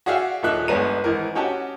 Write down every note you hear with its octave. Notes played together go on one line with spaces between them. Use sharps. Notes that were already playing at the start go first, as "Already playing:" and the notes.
F#4 G#4 D5 E5 F5 G5
D#1 A#2 D#4 E5 F#6
G1 G#3 B3 D5 A#5 D#7
G#1 E3 A#4
C#4 F#4 G4 D#5 A5